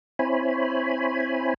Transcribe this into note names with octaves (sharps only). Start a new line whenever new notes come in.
C4 E4 C5 C#5 G#5 B5